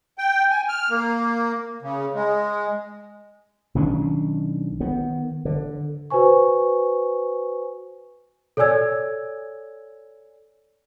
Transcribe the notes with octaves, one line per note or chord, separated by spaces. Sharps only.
G5
G#5
F6
A#3
C#3
G#3
B1 D#3 C#4 D4
D#3 B3
D3
F#4 B4 C5 G#5 C#6
A4 C#5 D5 G#5 E6 G#6